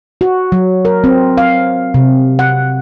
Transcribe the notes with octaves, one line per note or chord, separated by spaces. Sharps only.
F#4
F#3
A#4
C4
F5
C3
F#5